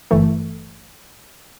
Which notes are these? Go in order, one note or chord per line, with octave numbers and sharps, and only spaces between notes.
G1 E3 A3